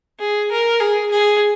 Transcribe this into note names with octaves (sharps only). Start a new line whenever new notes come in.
G#4
A#4
G#4
G#4